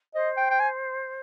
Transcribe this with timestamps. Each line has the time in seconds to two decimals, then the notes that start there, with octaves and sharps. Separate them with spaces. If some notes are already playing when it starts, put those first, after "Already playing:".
0.14 C5 D#5
0.37 G5
0.51 G5
0.60 G#5